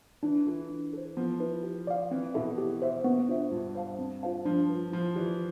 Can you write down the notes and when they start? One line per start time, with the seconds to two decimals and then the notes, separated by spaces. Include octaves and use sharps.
0.23 E3 D4
0.46 E3 F4 A4
0.69 D4
0.93 A4 C5
1.17 F3 B3
1.40 E4 B4
1.63 G4
1.87 D5 F5
2.11 E3 C4
2.34 B2 E4 A4 E5
2.58 G4
2.82 C5 E5
3.04 B3
3.28 D4 F4 C5 E5
3.51 G2 F4
3.75 C5 F5 A5
3.99 C4
4.23 F4 C5 F5 A5
4.45 F3 D4
4.69 F4 B4
4.93 F3 E4
5.16 E3 G4 D5